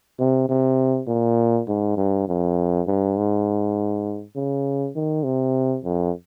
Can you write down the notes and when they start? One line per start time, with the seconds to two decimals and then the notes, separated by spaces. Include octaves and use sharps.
0.20 C3
0.49 C3
1.08 A#2
1.68 G#2
1.97 G2
2.28 F2
2.87 G2
3.17 G#2
4.36 C#3
4.96 D#3
5.24 C3
5.84 F2